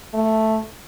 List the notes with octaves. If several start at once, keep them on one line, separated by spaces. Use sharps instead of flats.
A3